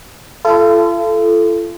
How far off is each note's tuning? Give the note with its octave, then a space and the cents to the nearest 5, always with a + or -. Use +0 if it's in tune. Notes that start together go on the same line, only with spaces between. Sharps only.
F4 -40 A4 -10